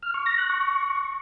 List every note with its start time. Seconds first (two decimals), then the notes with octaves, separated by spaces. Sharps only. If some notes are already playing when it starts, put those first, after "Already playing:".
0.02 F6
0.14 C#6
0.26 A#6
0.38 F#6
0.50 C#6